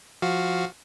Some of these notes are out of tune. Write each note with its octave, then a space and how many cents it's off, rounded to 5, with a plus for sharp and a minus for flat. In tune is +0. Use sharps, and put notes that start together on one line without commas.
F3 +10 F#4 +0 F5 +0